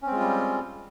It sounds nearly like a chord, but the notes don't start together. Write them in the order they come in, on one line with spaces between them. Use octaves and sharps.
C#4 C4 G#3 F4 G3